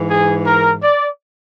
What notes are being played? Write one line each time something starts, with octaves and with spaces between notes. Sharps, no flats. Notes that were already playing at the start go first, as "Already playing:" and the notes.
Already playing: G#2 E3
G#4
A#4
D5